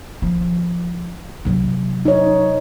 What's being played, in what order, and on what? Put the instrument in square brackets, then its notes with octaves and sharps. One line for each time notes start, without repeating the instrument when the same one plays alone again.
[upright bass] F3
C3 F#3
[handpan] D#4 C#5